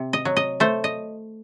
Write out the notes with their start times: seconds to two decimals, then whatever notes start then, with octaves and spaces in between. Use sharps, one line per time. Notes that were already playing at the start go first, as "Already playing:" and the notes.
Already playing: C3
0.13 D#5
0.25 F#3
0.36 D#5
0.60 A3 C5
0.84 D#5